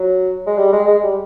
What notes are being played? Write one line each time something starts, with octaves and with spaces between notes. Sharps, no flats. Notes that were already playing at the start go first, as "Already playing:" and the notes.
Already playing: F#3
G#3
G3
G#3
G#3
G3